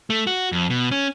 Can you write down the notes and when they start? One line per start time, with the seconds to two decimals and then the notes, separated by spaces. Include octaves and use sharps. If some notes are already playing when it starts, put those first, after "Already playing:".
0.10 A3
0.27 F#4
0.52 F2
0.70 B2
0.91 C#4